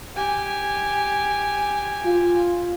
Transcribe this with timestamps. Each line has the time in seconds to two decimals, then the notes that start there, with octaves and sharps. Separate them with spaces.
0.15 G4 G#5
2.04 F4